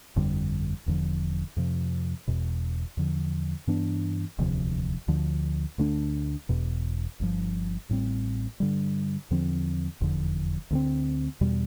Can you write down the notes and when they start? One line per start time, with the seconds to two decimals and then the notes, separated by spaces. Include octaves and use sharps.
0.16 G1 F2 D3 G3
0.86 E1 E2 D3 F3
1.56 F2 C3 F3
2.28 E1 E2 B2
2.97 E2 D3 F3
3.67 G2 E3 B3 D4
4.38 E1 D2 C3 F3
5.08 D2 D3 F3
5.78 D2 D3 A3 D4
6.49 E1 E2 B2
7.20 G1 G2 F3
7.89 A1 A2 G3 C4
8.60 G2 D3 G3
9.31 E2 D3 F3 C4
10.01 F1 E2 D3 F3
10.71 D2 D3 A3 C4
11.41 E2 B2 G3